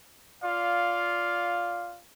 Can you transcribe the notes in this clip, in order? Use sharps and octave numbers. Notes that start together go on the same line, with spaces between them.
F4 D5 F5